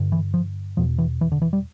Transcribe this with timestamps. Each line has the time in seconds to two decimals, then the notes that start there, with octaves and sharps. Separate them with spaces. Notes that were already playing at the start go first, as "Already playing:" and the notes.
Already playing: G2 D3
0.12 E3
0.34 F3
0.77 E2 B2 F3
0.98 E3
1.21 E3
1.32 D3
1.42 E3
1.53 G3